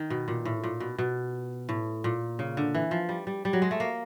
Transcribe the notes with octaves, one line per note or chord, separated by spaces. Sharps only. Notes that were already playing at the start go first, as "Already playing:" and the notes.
Already playing: D#3
B2
A#2
A2
A#2
B2
B2
A2
A#2
C#3
D3
E3
F3
G3
G3
G3
F#3
G#3
A3
A#3